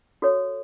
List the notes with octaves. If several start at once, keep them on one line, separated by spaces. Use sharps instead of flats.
F#4 A4 C#5